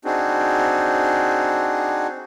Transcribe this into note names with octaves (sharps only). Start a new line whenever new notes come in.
C4 D4 D#4 F#4 G#4